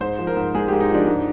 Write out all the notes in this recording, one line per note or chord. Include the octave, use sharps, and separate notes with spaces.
G#2 C5
F3
A#4
G#2
G#3 G#4
G#2 G4
D#4
F3 D4
G#2